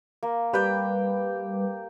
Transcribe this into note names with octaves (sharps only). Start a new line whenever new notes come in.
A#3
G3 G4 B4 G5